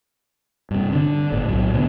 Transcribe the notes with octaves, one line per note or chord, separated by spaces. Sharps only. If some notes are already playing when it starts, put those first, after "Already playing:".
G2 C3
D3
G1 A2
B1 A2 F#3
B2 D3